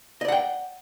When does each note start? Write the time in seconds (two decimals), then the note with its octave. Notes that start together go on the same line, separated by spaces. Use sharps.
0.21 D#5
0.25 D5
0.28 F#5
0.32 G5